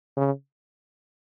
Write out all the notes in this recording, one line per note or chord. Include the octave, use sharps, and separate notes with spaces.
C#3